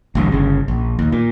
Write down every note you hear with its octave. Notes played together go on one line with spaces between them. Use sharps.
A1 D2 G2
G1 C#3
A#1
D#2
A#2